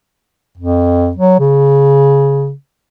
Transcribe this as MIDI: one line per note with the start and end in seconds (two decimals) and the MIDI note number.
0.57 1.12 41
1.17 1.37 54
1.39 2.52 49